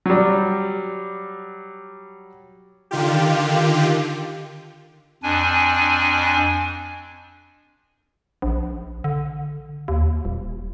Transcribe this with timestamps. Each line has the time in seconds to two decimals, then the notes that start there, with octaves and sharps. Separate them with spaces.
0.06 F#3 G3
2.91 D3 D#3 F4 G4
5.23 F2 D4 G#5
8.42 A#1
9.04 D3
9.88 D#2
10.25 D#1